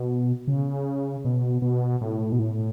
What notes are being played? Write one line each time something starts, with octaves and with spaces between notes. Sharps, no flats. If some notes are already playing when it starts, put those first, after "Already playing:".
Already playing: B2
C#3
B2
B2
A2
B2
A2